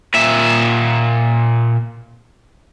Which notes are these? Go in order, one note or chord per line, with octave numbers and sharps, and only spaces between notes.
A#2 E5